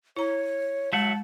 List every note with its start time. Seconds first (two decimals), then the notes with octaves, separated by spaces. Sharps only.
0.16 E4 C#5 A#5
0.93 F#3 G#3 E5 F#5 A5